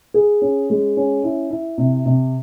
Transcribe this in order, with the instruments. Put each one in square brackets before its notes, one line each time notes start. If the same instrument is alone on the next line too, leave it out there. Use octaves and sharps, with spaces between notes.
[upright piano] G#4
C#4
G#3
C#4
E4
E4
C3
C3